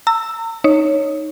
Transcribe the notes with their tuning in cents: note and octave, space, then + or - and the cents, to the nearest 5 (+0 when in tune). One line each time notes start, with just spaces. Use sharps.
A#5 -40 E6 +0
D#4 +0 C#5 +0